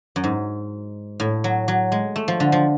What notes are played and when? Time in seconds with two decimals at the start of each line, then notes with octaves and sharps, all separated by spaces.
0.16 F#2
0.24 G#2
1.20 A2
1.44 F#3
1.68 F#3
1.92 G#3
2.16 A3
2.28 F3
2.40 D3
2.52 F3